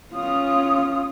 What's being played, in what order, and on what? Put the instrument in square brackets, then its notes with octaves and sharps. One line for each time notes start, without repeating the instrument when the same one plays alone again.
[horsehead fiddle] C#4 F4 [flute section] D#6